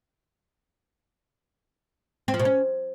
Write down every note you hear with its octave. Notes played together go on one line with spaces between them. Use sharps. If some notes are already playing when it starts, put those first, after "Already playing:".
C4
F3
B2
C#4